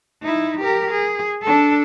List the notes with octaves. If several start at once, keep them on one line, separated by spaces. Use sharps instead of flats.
D#4 E4
G4 A#4
G#4
D4 A4